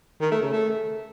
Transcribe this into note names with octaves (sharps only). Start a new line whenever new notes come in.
D#3
A3
C#3
A3